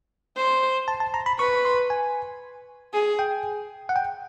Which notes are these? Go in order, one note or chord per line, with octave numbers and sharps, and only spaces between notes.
C5
A5
A5
A#5
B5
B4 C#6
C6
G#5
G#4
G5
F#5
G5